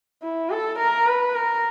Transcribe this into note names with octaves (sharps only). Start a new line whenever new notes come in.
E4
A4
A#4
B4
A#4